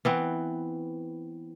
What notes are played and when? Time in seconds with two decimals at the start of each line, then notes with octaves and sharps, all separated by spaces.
0.05 E3 B3 C4